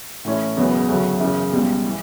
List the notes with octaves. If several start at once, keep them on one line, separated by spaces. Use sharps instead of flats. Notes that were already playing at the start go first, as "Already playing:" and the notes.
A2 E3 A3 C#4 E4
E1 E2 C#3 F#3 B3
D2 C#3 F#3 A3
F#2 C#3 E3
C#2 B2 G3
E3